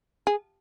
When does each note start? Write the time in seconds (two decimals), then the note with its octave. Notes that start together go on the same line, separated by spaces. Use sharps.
0.27 G#4